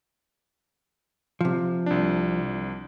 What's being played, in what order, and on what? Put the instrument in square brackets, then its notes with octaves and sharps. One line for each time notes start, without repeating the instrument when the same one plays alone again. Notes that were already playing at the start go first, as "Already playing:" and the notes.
[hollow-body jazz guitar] C3 F3
[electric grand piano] C2 D4